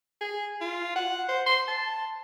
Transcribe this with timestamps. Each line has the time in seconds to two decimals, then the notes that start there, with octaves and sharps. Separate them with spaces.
0.21 G#4
0.61 F4
0.96 F#5
1.28 C5
1.46 C6
1.68 A5